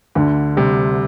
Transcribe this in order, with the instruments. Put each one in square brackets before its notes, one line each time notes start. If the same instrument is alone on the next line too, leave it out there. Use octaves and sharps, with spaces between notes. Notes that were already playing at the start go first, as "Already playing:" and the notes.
[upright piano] D2 [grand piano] D3
[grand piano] C3 [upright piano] G3